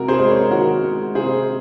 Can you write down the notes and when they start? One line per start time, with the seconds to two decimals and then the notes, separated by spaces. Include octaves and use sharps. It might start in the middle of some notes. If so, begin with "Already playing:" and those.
Already playing: C3 G#3 F#4 A#4
0.08 G#4 C5
0.19 G#3
0.30 A#4 C#5
0.51 D#3 F#4 A#4
0.83 G#3
1.15 C3 G#4 C5